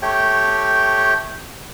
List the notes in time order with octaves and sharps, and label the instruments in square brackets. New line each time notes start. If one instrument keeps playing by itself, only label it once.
[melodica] A3 G4 C#5 G5